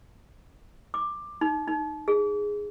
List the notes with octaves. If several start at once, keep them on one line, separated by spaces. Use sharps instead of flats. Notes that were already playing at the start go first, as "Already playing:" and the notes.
D6
D#4
D#4
G#4